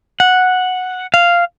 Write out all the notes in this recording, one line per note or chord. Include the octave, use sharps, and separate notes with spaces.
F#5
F5